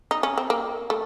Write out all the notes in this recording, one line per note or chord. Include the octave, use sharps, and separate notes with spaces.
D#4
C#4
C4
A#3
A3